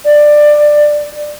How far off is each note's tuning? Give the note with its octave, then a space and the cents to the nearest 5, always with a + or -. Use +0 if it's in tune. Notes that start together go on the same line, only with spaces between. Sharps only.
D5 +15